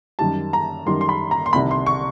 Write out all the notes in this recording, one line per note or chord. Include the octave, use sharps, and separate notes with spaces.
F#2 D#3 G3 A5
A#5
F#2 D#3 G3 C6
C6
B5
A#5
C6
C2 C3 D#3 B5
C6
C#6